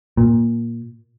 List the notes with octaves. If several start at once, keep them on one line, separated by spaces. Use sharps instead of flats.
A#2